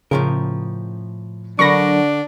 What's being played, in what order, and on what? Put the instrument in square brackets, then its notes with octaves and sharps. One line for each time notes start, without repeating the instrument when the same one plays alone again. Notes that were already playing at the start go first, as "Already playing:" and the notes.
[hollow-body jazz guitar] A2 F3 A#4 [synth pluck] C#3
[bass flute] D3 [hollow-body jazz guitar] F#3 A#4 B5 [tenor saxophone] D4 [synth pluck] C#6 A#6